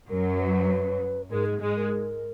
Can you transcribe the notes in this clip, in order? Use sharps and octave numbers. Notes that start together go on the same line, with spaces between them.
F#2 F#3 A#4
B4
G#2 G#3 A#4
G#4
G#2 G#3
A#4